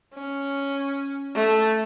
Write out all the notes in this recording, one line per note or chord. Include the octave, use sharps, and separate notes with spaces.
C#4
A3